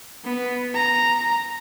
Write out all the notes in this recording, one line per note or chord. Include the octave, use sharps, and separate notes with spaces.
B3
A#5